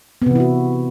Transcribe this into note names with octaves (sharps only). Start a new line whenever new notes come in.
C3 E3 B3 E4 F#4